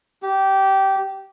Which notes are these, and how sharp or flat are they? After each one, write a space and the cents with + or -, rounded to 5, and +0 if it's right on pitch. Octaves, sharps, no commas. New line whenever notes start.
G4 -15